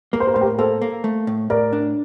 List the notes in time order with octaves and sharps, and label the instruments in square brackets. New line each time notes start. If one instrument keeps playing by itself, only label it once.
[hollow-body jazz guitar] A#3 [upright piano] A#4
[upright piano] C5
A#4
[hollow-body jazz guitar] A2 [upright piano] C5
[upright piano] G4 A#4
[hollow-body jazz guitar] A#3 [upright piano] A4 C5
[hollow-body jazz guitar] A#3
A3
A2
[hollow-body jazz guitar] A2 [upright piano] A#4 D5
[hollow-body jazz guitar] D4